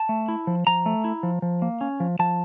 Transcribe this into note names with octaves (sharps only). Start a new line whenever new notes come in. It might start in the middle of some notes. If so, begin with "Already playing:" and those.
Already playing: A5
A3
E4
F3
F3 A#5
A3
E4
F3
F3
A#3
C#4
F3
F3 A5